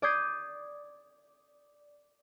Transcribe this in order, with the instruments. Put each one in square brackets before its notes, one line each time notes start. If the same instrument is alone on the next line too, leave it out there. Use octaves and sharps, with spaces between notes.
[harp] D5 D6 D#6 G6 G#6 C7